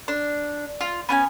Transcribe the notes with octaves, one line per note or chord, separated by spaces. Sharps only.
D4
F4
B3 C#4 G#5